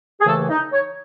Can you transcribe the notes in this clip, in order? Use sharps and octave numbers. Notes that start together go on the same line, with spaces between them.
G#4
D#2 C#3 E3 A3 A4
D#4
C#5